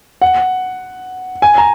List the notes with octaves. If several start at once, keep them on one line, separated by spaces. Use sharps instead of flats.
F#5
G#5
A#5